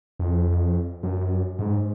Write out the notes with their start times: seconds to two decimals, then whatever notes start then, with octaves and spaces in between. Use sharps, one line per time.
0.19 F2
1.03 F#2
1.59 G#2